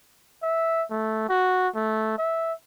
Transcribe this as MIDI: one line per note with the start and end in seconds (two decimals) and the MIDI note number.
0.43 0.84 76
0.91 1.27 57
1.29 1.68 66
1.75 2.14 57
2.18 2.53 76